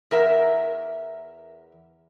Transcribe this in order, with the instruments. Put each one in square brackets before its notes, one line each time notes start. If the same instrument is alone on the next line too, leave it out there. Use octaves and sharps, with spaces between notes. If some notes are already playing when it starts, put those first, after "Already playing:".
[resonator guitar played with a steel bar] E2 A#4 E5